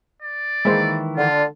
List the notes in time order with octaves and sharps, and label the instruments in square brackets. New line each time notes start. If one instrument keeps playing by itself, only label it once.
[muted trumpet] D5
[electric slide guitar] D#3 E3 E4 [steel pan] G#3 A#3 C5
[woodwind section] D3 [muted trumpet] F4